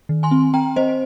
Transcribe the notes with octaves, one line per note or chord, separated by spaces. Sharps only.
D#3
G#5 C6
C4
C4 G5 A#5
C4 C5 D#5